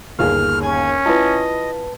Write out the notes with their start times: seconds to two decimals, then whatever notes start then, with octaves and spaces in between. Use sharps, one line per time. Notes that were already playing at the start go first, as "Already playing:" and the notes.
0.19 G1 D#2 G#4 F6
0.62 C#4 G#5
1.06 E4 F4 B4 D#5 A5